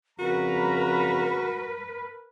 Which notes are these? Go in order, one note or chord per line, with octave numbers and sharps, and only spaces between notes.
F2 C#3 F#4 A#4 B4 A#5